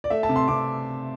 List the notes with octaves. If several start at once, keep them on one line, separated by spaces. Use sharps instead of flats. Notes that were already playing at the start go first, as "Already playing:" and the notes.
D5
A3 E5
A5
C3
C6
C3 D6